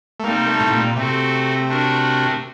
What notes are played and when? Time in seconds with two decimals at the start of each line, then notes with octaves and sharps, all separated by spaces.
0.20 A3
0.24 C3 G3 A#3 C4 D#4
0.48 A3
0.60 A2
0.72 A#2
0.96 C3 A3 C4 F#4 A4
1.68 A3 D4 F#4 A#4